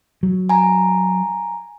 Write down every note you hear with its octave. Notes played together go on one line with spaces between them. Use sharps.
F#3
G#5 A#5